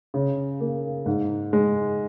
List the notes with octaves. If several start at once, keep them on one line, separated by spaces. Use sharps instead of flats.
C#3
A#3
G#2
G#3